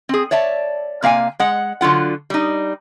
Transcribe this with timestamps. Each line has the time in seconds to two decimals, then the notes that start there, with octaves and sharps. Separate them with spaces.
0.09 C4 G#4
0.31 C#5 D5 E5 A5
1.02 C3 A#3 F5 G#5
1.39 G#3 F#5
1.81 D3 F#3 F4 F#5
2.30 G3 D#4